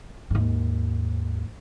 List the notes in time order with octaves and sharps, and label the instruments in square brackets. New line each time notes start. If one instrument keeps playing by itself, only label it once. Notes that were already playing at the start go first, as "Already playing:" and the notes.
[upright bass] D#2 G#2